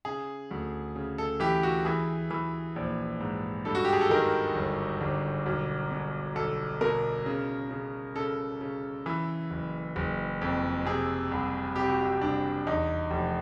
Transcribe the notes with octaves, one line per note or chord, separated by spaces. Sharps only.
C#3 G#4
D2
C#3
A4
E3 G4
F#4
E3 G#4
E3
A#1
G#2
G2 A4
F#4
G4
G#4
A4
D#3 A#4
G1
G1
B1
B2
B1 A4
B2 A#4
C#3
C#3
C#3 A4
C#3
E3
F#1
F#1
F2
C3 G#4
C2
C3 G4
F#4
G4
C2 D4
E2 D#4
F1